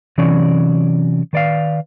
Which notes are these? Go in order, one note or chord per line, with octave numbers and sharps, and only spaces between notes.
C3 E3 F#3 C#4 D5
D#3 B4 D5 D#5 F5